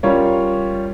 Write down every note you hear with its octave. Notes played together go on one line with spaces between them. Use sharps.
G3 C#4 F4 A#4 C#5